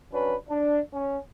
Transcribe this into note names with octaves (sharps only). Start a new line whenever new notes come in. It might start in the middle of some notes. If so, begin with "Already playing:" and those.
F#3 C#4 D4 B4
D4
C#4